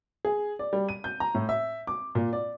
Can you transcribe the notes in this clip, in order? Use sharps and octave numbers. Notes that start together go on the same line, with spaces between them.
G#4
D5
G3
D#7
G6
A#5
A2
E5
D6
A#2
D5